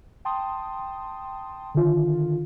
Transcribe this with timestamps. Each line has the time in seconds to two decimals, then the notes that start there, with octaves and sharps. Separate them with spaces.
0.25 G5 A5 C6 D#6
1.75 D3 D#3 F4